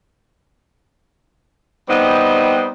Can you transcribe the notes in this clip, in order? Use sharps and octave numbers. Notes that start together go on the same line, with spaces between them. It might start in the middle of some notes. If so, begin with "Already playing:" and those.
G3 B3 C4 D#4 D#5